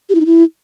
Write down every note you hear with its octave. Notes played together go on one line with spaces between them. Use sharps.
G4
E4
D#4
E4